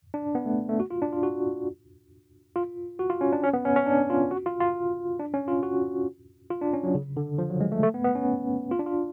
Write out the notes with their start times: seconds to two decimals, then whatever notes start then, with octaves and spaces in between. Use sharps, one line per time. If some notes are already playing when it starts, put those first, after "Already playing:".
0.14 D4
0.35 B3
0.46 A3
0.69 A3
0.80 F#4
0.91 F4
1.02 D4
1.12 F4
1.23 F#4
2.56 F4
2.99 F#4
3.10 F4
3.21 C#4
3.33 D4
3.43 C#4
3.53 B3
3.65 C#4
3.76 C#4
3.86 D4
4.10 F4
4.31 F#4
4.46 F4
4.60 F4
5.19 D4
5.34 C#4
5.48 F4
5.63 F#4
6.50 F4
6.61 D4
6.73 C#4
6.83 F#3
6.95 C#3
7.17 D3
7.38 F3
7.50 F#3
7.60 G#3
7.72 A3
7.83 A3
7.94 B3
8.04 B3
8.15 C#4
8.71 F4
8.79 D4
8.86 F4